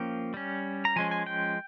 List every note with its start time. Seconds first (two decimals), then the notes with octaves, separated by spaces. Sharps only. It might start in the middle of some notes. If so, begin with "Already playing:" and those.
Already playing: F3 A#3 C#4 G5
0.34 G3 C#4
0.85 A#5
0.96 F3 G#3 C#4 G#5
1.11 G#5
1.26 G5